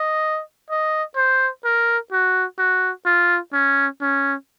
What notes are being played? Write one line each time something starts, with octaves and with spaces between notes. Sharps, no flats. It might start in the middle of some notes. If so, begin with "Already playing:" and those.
Already playing: D#5
D#5
C5
A#4
F#4
F#4
F4
C#4
C#4